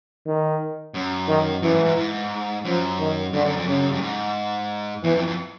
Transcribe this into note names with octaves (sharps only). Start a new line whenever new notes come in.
D#3
F#2
D#3
F#2 E3
G#2
G#2
G#2
F#2 F3
D#3
G2 D3
F#2
F2
F#2 C#3
G2
G#2
E2 E3
F2
F2